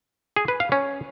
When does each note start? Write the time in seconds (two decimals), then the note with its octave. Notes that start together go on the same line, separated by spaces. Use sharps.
0.37 G#4
0.48 B4
0.60 F5
0.72 C#4